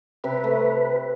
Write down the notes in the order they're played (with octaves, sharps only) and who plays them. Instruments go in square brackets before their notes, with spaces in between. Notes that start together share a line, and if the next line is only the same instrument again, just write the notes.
[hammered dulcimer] C3 [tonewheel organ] B4
[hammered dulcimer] A3